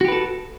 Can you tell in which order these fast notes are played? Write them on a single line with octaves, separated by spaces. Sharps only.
F#4 G4 B4 A4